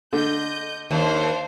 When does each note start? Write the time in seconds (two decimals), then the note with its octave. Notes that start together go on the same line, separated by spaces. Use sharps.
0.13 D3 D#5 G6
0.91 D#2 D4 C5 F5